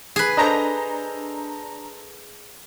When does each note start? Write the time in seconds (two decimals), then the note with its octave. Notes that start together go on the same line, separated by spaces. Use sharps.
0.16 G#4 B4
0.37 D4 A4 C5 D#5 A#5